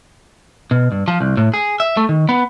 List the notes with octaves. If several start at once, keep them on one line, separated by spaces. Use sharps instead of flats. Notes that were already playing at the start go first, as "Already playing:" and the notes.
B2
G2
F3
C2
A2
G#4
E5
A3
D#3
B3